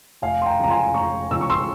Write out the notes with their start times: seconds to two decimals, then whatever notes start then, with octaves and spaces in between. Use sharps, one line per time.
0.22 F1 F5 G#5
0.42 C6
0.46 G5 A#5
0.59 E2 C#3 F3 G#3 A#5
0.70 G#5 C6
0.94 F1 A#5 C#6
1.31 E2 C#3 F3 G#3 E6
1.41 C#6
1.50 C6 E6